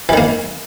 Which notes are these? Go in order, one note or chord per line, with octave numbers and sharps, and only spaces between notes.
D#3 E3 A#3